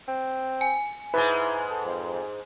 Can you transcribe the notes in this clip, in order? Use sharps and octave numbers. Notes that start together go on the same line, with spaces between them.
C4
G#5
G#2 G#3 E4 B4
A4
F2